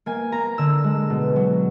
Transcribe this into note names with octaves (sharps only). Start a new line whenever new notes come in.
A#3 G#5
A#3 A#5
D3 E6
G#3
B2
F#3